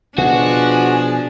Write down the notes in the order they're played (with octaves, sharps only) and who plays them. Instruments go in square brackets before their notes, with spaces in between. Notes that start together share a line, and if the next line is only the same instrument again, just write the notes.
[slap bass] B2 [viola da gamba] F3 D4 [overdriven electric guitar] F#4 [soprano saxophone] G#4